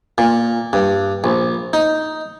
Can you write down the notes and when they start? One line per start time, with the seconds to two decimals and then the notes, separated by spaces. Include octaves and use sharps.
0.18 A#2
0.73 G2
1.24 A#1
1.73 D#4